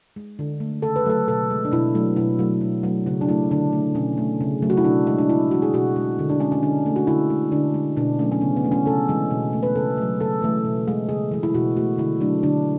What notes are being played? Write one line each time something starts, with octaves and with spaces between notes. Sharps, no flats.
G#3
D3
A3
C#3 A4
B4
F#3 A3 A4
B2 A4
G#3
D4
B2 E4
F#3 A3
B2 E4
F#3 A3
B2
F#3 A3
C#3 F#4
D4
F#3 A3 E4
D3 D4
A3
B2 C#4
A3
C#3
F#3 A3
F#4
E4
B2 D4
G#3
D4
C#3 E4
E3 G#3 F#4
G#4
B2 F#4
G#3
D3
D4
G#3 C#4
C#4
D3 D4
A3
F#4
D3 E4
G#3
D3 D4
G#3
B2 D4
F#3 A3 C#4
C#4
C#3 B3
B3
E3 A3
C#4
C#3 A4
E3 G#3
B2
A3
B4
C#3 A4
F#3 A3
C#3 A4
E3 A3
B2
G#3
C#3 G#4
E3 G#3
E4
B2 F#4
A3 F#4
D3 E4
F#3 A3 D4
D3 D4